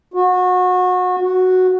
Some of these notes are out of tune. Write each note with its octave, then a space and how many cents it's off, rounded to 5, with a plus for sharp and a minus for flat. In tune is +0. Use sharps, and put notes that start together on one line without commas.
F#4 -25
F#4 +0